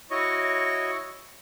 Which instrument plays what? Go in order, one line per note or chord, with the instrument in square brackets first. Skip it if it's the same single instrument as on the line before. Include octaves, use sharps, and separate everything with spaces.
[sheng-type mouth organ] E4 F#4 C#5 D#5 C#6